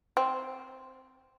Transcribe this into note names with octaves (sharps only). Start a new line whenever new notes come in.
C4